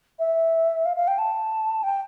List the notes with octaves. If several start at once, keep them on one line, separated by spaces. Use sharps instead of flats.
E5
F5
F5
G5
A5
G5